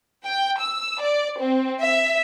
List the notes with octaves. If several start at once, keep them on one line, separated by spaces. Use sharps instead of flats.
G5
E6
D5
C4
E5